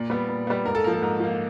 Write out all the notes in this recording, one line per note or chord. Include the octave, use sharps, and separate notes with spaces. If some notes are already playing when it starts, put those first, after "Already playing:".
Already playing: A#2 D5
G3 B3
A#2
G3 B3
G#2 A#4
A4
F3 A#3 A#4
A4
G#2 A#4
F3 A#3